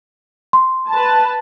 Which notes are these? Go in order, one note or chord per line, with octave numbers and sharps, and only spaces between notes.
C6
B4 A5